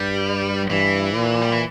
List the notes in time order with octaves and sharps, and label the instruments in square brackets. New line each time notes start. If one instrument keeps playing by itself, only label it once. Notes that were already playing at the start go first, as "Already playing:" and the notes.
Already playing: [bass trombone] G2 [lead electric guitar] G3
[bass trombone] G2 [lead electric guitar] E3
[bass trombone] A#2
[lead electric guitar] G3
E3